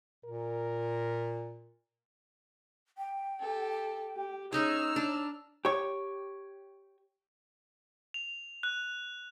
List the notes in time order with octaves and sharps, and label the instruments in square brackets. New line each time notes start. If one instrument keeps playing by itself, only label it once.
[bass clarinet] A#2 [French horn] A#4
[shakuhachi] G5
[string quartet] G4 A4
[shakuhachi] G5
[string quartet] G4
[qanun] C#4 D#4 G#4 [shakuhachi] C#5 [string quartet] A#5 E6 F6
[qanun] D4
[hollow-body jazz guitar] G4 C#5
[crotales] F7
F#6